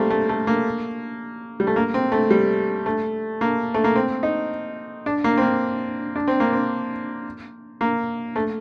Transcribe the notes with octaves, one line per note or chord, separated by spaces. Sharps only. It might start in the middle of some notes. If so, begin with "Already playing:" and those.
Already playing: G3 A3 A#3 C4
A3
A3
A#3
G3
A3
A#3
C4
A3
G3
A3
A#3
A3
A#3
C4
D#4
D4
A#3
C4
A#3
D4
C4
A#3
C4
A#3
A3